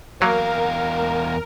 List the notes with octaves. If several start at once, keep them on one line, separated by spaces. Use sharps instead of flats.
E2 F#3 A#3 A#4 F5